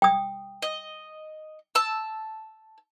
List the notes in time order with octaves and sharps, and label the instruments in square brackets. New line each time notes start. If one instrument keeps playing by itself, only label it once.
[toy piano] G5 D#6
[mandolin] D#5
A5 E6